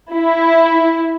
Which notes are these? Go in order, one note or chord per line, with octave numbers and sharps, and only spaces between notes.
E4